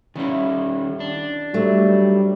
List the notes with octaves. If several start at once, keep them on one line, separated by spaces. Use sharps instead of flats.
D#3 G3 C#4 D#4 E4
D4
G#2 F#3 G3 A3